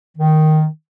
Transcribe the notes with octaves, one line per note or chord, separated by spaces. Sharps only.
D#3